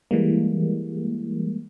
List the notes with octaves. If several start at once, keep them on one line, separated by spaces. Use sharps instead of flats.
E3 G3 G#3 A#3